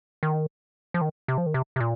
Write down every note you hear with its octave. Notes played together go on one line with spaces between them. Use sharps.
D#3
F3
D#3
C3
F3
D#3
C3
C3
A#2